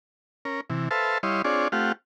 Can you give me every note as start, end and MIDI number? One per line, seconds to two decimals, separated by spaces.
0.45 0.61 61
0.45 0.61 70
0.70 0.89 48
0.70 0.89 52
0.91 1.18 69
0.91 1.18 71
0.91 1.18 72
0.91 1.18 76
0.91 1.18 77
0.91 1.18 81
1.23 1.42 55
1.23 1.42 64
1.23 1.42 73
1.23 1.42 75
1.23 1.42 77
1.23 1.42 84
1.44 1.68 60
1.44 1.68 62
1.44 1.68 65
1.44 1.68 68
1.44 1.68 73
1.44 1.68 74
1.72 1.92 57
1.72 1.92 60
1.72 1.92 65
1.72 1.92 67
1.72 1.92 77
1.72 1.92 78